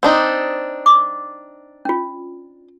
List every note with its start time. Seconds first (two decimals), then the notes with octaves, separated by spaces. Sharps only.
0.03 C4 D4 D#4
0.86 D6
1.85 C#4 F4